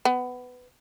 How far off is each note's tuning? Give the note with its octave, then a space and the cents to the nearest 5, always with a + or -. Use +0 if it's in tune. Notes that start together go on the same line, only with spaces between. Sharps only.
B3 +15